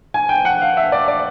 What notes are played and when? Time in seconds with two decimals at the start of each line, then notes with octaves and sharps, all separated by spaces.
0.14 G#5
0.29 G5
0.45 F#5
0.62 F5
0.77 E5
0.92 D5
1.08 D5